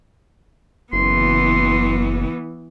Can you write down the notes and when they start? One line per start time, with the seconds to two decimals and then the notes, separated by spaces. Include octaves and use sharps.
0.93 F#1 E3 B3 C6